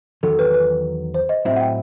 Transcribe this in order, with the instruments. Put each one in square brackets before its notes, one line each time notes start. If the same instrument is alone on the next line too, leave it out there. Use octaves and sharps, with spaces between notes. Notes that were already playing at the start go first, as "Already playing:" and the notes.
[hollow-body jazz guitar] E2 D#3 F#3 [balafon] A4
[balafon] B4
B4
C5
D#5
[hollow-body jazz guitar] A2 F#3 C4 E4 [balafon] E5
[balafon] F#5
G5